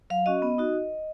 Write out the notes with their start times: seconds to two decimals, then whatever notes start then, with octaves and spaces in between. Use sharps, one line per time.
0.10 F#3 F5
0.26 C#4 F#4 D#5
0.42 B3
0.58 D#4 F#4